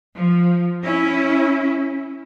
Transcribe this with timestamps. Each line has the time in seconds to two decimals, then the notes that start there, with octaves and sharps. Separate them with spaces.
0.15 F3
0.82 C#4 E4